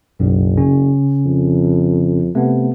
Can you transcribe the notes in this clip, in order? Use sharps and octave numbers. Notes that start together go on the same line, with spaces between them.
F#1 B1 F#2
C#3 C#4
F2
C3 A3 B3